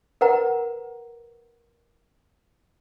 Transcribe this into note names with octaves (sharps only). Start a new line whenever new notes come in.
A#4 B4 F#5 A#5